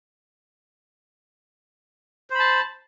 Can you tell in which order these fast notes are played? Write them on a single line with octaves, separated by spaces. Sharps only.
C5 B5 A5